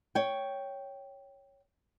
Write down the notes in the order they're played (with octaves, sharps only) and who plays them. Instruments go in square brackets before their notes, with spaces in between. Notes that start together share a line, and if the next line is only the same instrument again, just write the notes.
[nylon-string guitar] C#5 G5